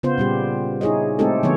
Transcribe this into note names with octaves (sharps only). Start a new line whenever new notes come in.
C#3 B3 F4 C5
A#2 G3 G4
D#4 E4 G#4 C#5 D#5
G#3 A3 C4 D#4 G4 A4
D3 F3 B3 C#5